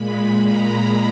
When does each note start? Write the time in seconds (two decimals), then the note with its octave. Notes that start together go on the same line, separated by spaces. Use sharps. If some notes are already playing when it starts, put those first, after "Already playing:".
Already playing: A#2 G#3 B5
0.44 A#5